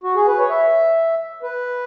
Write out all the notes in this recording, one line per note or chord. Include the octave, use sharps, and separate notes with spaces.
F#4
G#4
B4
C#5
E5
B4